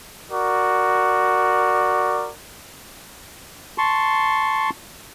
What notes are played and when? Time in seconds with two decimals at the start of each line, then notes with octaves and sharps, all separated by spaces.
0.29 F#4 A#4 D5
3.78 A5 C6 C#6